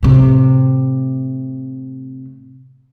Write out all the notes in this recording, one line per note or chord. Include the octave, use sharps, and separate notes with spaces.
A2 C3